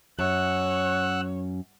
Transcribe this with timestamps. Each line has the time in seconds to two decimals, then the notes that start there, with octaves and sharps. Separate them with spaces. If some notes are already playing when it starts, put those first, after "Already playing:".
0.19 F#2 C#5 F#5 E6 F#6